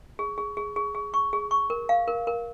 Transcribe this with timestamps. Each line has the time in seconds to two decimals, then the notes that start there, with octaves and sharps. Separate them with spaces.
0.19 G#4
0.38 G#4
0.57 G#4
0.76 G#4
0.95 G#4
1.14 C#6
1.33 G#4
1.51 C#6
1.70 A#4
1.89 F5
2.08 A#4
2.27 A#4